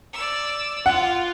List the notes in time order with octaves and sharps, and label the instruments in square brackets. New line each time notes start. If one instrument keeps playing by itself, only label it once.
[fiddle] D5 E6
[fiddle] F4 [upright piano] F#5